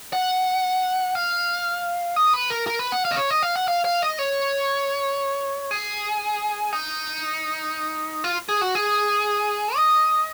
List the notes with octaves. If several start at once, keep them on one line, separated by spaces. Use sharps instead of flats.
F#5
F5
D#5
B4
A#4
A#4
B4
F#5
F5
D#5
C#5
D#5
F5
F#5
F5
F5
D#5
C#5
G#4
D#4
F4
G#4
F#4
G#4
D#5